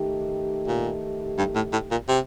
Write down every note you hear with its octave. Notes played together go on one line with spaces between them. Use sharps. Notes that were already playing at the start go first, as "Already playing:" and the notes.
Already playing: D#3 A3 D#4 G4
A#2
G2
A2
A2
A#2
C3